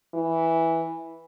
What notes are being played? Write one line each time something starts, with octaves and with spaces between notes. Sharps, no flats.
E3